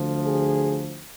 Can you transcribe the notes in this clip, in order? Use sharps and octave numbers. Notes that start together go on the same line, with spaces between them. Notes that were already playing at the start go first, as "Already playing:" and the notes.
Already playing: D2 D3 F3
G#4